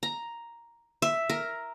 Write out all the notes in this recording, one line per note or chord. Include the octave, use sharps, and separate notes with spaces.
A#5
E5
A#4